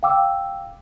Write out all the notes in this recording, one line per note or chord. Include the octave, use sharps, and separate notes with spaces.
F5 G5 D6 E6